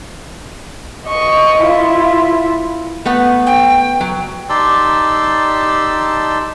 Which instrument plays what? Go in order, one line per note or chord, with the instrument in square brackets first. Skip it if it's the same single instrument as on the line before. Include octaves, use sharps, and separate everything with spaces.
[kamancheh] D#5 C#6
E4 F4
[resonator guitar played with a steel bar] A3 B3 F#5
[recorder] G5
[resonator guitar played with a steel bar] F#3
[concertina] D#4 G4 D5 A5 C6 E6